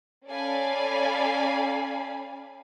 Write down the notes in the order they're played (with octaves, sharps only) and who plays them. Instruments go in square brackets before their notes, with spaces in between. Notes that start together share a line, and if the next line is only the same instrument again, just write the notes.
[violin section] C#4 A4 D5 F5 G#5 B5